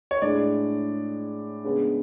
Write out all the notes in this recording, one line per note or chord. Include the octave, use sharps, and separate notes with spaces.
C#5
A2 G#3 D4 D5
C#3 G#3 B3 D4